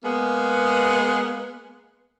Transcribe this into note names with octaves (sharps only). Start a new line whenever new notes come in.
G#3 A#3 B3